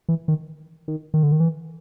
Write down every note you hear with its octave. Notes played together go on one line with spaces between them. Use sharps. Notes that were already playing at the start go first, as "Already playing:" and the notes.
E3
D#3
D#3
D#3
D3
D#3
E3